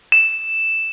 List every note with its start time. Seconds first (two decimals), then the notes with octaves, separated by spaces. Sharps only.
0.12 E7